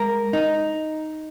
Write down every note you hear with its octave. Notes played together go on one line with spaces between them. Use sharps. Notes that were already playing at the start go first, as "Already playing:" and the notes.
Already playing: G#3 A#4
D#4